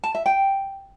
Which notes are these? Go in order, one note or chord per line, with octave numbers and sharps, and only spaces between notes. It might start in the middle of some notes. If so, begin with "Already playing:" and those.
A5
E5
G5